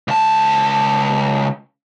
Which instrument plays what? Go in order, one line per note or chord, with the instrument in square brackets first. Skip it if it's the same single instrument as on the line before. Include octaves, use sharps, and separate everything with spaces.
[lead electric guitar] C#2 A5